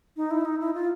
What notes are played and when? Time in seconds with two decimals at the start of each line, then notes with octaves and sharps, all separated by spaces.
0.17 D#4
0.31 E4
0.45 D#4
0.60 E4
0.74 F4